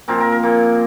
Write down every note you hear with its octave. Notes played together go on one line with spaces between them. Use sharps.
A#2 F3 C4 A#4
A#4
A#4
A#2 A#3